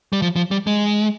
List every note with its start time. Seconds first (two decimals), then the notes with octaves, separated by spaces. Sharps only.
0.13 G3
0.22 F3
0.36 F3
0.51 G3
0.67 G#3